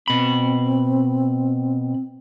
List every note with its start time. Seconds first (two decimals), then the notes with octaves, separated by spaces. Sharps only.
0.08 B2 C4 B5